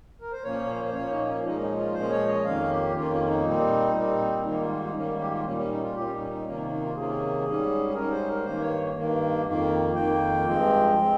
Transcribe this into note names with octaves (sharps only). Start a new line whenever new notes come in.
A#4
C5
A#2 F3 A#3 C#4 C#5
C5
C5
A#2 F3 A#3 C#4 C#5
D#4
C#4
A#2 F3 G#3 C#4 D#4
D#4
F4
A#2 F3 G#3 C#4 C5
C#5
D#5
F2 D#3 A#3 C#4 F5
G4
F2 D#3 A#3 C#4 F4
C#4
D#4
A#2 G3 C4
A#2 G3 C4
G#2 D#3 G3 A#3 D#4
F4
D#4
G#2 D#3 G3 A#3 C#4
G4
F4
A#2 G3 C#4
D#4
C#4
D#4
F4
A#2 G3 C#4 G4
C#4
D#4
C#4
D#4
C3 D#3 A#3 C#4
D#4
D#4
F4
C3 D#3 A#3 C#4 G#4
G#2 G3 C#4
G#4
G#2 G3 C#4 A#4
C5
A#4
G2 D#3 A#3 C5
C#5
G2 D#3 A#3
F2 D#3 A#3
F2 D#3 A#3 G5
G2 F3 G#3 C4
F3 G#3 C4